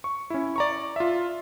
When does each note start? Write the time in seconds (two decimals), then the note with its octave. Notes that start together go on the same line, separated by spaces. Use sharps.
0.04 C#6
0.30 C#4 E4
0.56 D5 A#5 C#6
0.96 F4 E5